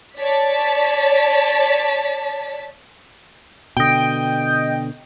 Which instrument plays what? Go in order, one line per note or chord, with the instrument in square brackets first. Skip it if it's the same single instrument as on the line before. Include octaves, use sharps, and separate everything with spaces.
[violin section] C#5 D5 A5 B6
[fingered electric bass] B2 D3 [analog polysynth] D#5 G5